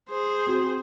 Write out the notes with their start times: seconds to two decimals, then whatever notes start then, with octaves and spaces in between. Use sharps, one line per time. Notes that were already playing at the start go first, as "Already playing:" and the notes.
0.10 G#4 C5
0.46 C4 F#4